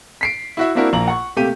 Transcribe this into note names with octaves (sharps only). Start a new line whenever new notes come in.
B6 C7 D7
E4 F#4 E5
A#3 C4 D4 E4 F#4 A#4
A#1 A#3 A#5 F#7
F#5 C#6
C3 A3 A#3 G4 D#7